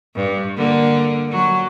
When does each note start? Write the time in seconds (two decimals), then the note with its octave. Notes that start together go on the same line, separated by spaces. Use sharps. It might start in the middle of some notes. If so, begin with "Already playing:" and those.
0.15 G2
0.57 D3 A#3
1.31 F#3